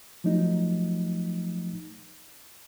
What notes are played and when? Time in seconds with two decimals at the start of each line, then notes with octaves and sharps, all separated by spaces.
0.24 F3 F#3 A3 D#4